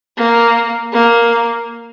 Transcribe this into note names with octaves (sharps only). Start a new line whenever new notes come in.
A#3
A#3